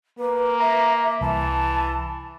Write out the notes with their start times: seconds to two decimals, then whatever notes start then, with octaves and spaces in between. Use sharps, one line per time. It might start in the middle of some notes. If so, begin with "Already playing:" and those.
0.19 A#3 B4
0.60 E5 A#5
1.21 C2 E3 A5